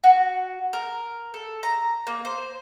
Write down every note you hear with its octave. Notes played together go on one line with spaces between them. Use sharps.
F#4
A#4
A4
A#5
A#3
C5